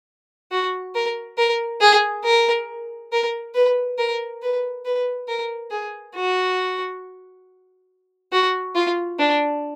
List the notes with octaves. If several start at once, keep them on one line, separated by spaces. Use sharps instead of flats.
F#4
A#4
A#4
G#4
A#4
A#4
B4
A#4
B4
B4
A#4
G#4
F#4
F#4
F4
D4